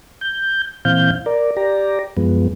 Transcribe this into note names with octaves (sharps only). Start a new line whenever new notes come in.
G6
A#2 E3 C4 F5 G6
A#4 D5
G4 D5 A#5
F#2 F3 G#3 B3